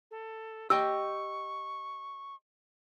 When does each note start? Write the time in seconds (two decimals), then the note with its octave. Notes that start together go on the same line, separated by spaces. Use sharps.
0.11 A4
0.70 G4 D#5 G5 C#6 E6